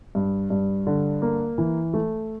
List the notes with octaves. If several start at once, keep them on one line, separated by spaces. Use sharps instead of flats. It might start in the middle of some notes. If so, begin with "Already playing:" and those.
G2
G2
D3
A#3
E3
A3